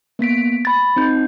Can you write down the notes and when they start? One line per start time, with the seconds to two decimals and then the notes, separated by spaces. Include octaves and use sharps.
0.19 A#3 B3 B6 D7
0.65 B5 A6
0.96 C4 D#4 G6